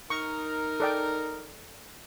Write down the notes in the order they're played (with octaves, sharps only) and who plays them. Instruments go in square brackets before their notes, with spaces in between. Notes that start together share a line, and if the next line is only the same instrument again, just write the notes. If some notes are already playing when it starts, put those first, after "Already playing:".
[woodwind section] D#4 A#4 [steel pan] C#6
[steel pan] A4 D5 G5